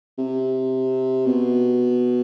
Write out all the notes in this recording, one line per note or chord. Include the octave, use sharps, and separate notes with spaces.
C3
B2